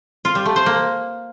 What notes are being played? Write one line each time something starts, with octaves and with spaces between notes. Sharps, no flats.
F4
G3
A3
C5
A#3